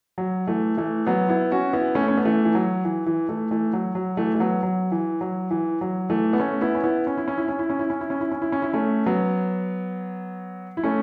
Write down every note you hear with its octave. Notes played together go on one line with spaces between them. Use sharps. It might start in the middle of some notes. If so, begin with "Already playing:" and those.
F#3
E3 A3
E3 A3
F#3 B3
B3 E4
C#4 F#4
B3 E4
A3 C#4
C#4
B3
E3 A3
E3
F#3
E3
E3
E3 A3
E3 A3
F#3
F#3
E3 A3
A3
F#3 B3
F#3
E3
F#3
E3
F#3
E3 A3
B3
A3 C#4
B3 E4
C#4
B3 E4
C#4
E4
C#4
E4
C#4
E4
C#4
E4
C#4
E4
C#4
E4
C#4
E4
C#4
E4
A3 C#4
F#3 B3
E4
A3 C#4